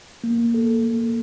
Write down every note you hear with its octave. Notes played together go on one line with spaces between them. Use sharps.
A#3
A4
A#3